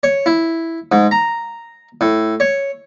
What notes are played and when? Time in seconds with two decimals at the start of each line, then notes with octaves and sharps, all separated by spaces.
0.03 C#5
0.26 E4
0.92 G#2
1.11 A#5
2.01 A2
2.40 C#5